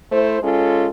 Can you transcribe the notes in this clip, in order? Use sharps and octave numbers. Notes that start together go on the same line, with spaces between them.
A3 E4 C5
G#3 C#4 F4 A4